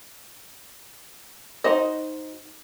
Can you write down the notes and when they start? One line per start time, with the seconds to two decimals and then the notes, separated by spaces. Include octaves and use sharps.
1.64 D#4 F#4 C5 D#5